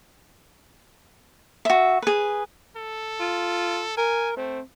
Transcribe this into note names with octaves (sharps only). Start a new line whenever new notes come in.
F#4 E5
G#4 B4
A4
F4
A#4 G#5
A3 C4